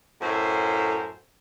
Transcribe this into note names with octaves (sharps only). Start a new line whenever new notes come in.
F#2 A2 A4 C5